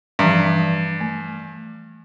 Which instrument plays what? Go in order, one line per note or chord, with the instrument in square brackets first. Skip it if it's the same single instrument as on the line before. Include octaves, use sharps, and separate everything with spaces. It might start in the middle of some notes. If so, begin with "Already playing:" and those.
[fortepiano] G2 [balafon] E3 F3 A#5
[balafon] A3